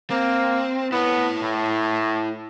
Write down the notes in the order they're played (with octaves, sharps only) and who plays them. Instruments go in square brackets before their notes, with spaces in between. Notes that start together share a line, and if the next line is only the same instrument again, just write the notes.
[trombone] A#3 [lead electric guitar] C4
[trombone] B3 [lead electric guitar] E4 C#5
[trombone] A2